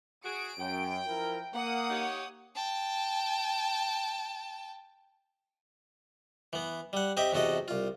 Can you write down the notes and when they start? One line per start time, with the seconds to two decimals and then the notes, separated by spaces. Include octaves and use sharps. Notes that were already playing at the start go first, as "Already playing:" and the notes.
0.24 F#4 G#4 D7
0.59 F#2 G5
1.08 F3 E4 A#4
1.54 A#3 F#5 D#6
1.90 D#4 G4 C#5
2.55 G5 A5
6.53 E3 B3
6.93 G3 F#5
7.17 C4 G4 D#5 E5
7.33 E2 C3 F#4 A4 D#5
7.68 C2 F4